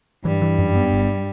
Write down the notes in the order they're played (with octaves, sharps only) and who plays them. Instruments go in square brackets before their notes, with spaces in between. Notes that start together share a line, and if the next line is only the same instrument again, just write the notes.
[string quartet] G2 G3 [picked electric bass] E3
[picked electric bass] E3
F#2
B3
G1